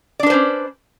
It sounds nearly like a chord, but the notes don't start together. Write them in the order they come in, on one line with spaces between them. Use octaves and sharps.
D5 D4 B4 C5 C#4